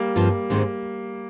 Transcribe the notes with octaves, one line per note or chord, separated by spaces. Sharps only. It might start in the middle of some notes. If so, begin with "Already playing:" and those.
Already playing: G3 A#3
G2 F3 C4 F4
G#2 D#3 G#3 C4